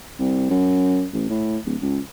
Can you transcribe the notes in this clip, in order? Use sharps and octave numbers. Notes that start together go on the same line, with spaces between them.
C2
F#2
A1
A2
D1
C#2